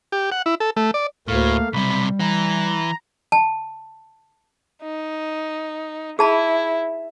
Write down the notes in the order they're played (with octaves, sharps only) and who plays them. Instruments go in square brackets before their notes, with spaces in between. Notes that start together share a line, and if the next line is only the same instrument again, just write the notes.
[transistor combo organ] G4
F#5
E4
A4
A3
D5
[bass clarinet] D2 [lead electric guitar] A2 [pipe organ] A3 A#3 F5
[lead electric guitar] B1 C3 [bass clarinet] G3 [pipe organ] B5
[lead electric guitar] E3 [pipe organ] A#5
[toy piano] A5
[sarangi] D#4
[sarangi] E4 [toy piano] G#4 A5 B5